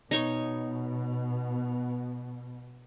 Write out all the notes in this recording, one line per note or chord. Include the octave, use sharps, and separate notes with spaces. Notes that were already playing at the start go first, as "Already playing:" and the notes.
B2 D#4 C#5 C#6